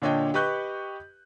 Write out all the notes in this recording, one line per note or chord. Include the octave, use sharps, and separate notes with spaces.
A#2 D3 D4 C#5 D#5 G5
G4 B4 D#5 C#6 F#6 G6